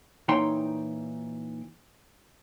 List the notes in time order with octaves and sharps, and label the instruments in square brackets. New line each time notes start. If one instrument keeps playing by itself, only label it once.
[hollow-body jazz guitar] A#2 E3 D#4 C#5 G5 C6